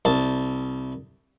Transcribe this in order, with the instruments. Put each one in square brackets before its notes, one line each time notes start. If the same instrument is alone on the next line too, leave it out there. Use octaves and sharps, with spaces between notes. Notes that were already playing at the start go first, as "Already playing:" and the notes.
[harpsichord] C2 A5